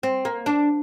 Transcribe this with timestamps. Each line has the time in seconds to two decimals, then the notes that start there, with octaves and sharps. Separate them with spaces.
0.03 C4
0.25 A#3
0.46 D4